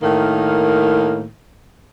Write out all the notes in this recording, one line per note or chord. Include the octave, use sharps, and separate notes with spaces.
A2 D#3 A#3